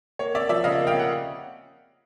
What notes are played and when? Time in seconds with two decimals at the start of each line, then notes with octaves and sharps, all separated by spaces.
0.19 A#3 C#5
0.34 C#4 D5 E5
0.49 F3 D5 E5
0.64 C#3 D#5 F5
0.79 A#3
0.87 F5 G5
0.94 C#4
0.99 F#5